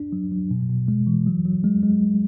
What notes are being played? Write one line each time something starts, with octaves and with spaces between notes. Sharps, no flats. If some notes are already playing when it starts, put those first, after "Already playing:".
Already playing: D4
F#3
F#3
B2
B2
G#3
E3
F#3
F#3
G#3
G#3